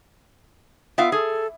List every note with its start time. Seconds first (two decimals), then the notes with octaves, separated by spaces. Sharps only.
0.98 B3 F4 E5 F5
1.12 G#4 A4